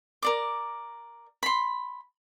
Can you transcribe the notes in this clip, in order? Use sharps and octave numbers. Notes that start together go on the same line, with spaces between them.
A#4 D5 D6
B5 C6